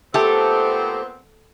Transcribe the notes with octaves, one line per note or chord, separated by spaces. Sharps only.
A#2 A3 B3 C4 G4 A4